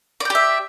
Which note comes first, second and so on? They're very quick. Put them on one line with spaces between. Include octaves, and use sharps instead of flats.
D5 G5 G4 E5